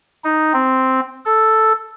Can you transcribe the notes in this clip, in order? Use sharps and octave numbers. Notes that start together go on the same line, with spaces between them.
D#4
C4
A4